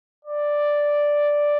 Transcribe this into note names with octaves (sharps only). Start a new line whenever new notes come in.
D5